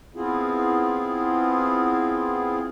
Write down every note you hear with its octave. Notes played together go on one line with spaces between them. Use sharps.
B3 C4 E4 F4 G#4